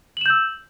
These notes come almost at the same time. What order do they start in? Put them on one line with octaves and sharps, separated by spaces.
F#7 E7 G6 E6